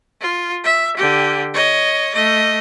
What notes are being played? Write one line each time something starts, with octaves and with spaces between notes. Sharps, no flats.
F4
E5
D3 G4
C#5 D#5
A3 D#5